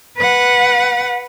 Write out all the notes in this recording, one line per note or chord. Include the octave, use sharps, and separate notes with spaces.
B4 F#5